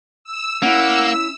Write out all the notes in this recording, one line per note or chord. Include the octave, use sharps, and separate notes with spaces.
E6
A#3 C#4 E4 F#5 E6